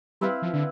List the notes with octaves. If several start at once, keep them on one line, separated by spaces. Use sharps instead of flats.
G3 C4 E4 B4 F5
F3
D3